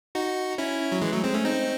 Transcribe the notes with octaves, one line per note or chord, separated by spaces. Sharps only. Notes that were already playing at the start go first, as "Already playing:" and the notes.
D#4 F#4
C#4 E4
F#3
E3 G#3
F#3 A3
G#3 C4
A3 C#4
C4 D#4